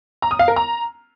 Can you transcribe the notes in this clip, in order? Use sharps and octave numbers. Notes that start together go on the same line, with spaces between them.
A#5
D#6
F5
A#4
A#5